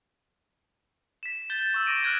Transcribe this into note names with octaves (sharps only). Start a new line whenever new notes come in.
B6 E7
G6 A6 G7
A6
C#6 E6
D6 A#6 D7 D#7
F6 F#6 G#6